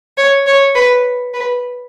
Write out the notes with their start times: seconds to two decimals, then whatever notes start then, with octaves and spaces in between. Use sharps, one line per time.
0.17 C#5
0.47 C#5
0.75 B4
1.34 B4